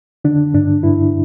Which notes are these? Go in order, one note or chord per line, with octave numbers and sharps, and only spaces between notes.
D3 D4
G2 D4
G2 E4